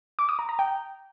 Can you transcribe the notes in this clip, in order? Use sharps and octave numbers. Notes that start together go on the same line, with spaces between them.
D6
D#6
A#5
A#5
G5